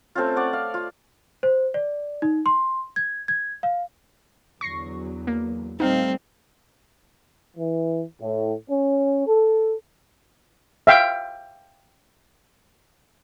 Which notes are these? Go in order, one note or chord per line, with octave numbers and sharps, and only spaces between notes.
A3 C4 C#4 F4
C#5 D5 F#5
F5
F4
C5
D5
D#4
C6
G#6
G#6
F5
E2 D3 F#3 C#6 A#6 C7
A#3
A#2 G3 A3 C4 D#4 F5
E3
A2
C#4
A4
E5 F5 G5